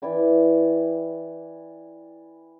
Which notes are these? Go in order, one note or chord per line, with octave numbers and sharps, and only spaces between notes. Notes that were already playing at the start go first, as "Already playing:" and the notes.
E3 E4 D5 G5